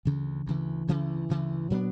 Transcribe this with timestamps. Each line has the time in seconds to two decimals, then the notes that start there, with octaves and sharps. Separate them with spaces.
0.05 D2 C#3 E3
0.46 D2 C#3 E3
0.88 D2 C#3 E3
1.29 D2 C#3 E3
1.70 A#2 F#3 B3 D4